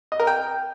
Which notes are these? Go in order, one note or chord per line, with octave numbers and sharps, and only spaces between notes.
D#5
A#4
G5